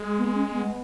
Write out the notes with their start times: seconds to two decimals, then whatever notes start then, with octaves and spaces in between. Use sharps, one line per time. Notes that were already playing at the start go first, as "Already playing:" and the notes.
Already playing: G#3
0.19 B3
0.35 C#4
0.52 B3